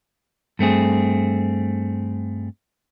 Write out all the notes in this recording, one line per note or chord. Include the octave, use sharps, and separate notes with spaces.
G2 A3 C4 G#4